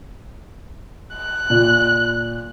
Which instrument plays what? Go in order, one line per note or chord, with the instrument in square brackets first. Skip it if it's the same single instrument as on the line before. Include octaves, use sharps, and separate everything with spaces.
[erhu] F#6
[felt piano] A#2